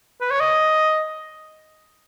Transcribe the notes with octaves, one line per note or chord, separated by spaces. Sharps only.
B4
C#5
D#5